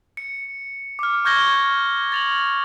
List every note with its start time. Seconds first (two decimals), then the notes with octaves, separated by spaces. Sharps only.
0.17 C#7
0.99 D6 F6
1.25 C#6 F6 G6 G#6 A#6 G7
2.12 A6 F7 F#7